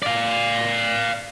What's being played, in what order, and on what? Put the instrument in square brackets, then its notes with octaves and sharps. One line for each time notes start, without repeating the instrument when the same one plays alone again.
[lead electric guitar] D5 F5